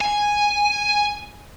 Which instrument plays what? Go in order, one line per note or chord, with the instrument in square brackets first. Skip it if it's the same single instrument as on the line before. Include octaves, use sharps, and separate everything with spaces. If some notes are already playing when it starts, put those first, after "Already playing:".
[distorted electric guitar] G#5